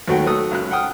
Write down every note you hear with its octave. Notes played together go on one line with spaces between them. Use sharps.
D#2 F#3 A3 F#5 G5
F#3 A3 D#6 E6
C#2 F#2 F#6
F#5 G5 D#6 F6